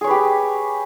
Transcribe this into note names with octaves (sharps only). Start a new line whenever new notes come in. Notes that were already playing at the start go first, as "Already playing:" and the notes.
G4 G#4 B4 C#5